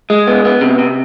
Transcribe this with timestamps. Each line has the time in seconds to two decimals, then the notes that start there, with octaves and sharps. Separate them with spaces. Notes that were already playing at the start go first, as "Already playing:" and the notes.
0.10 G#3
0.27 B3
0.45 B3
0.61 C3
0.79 C3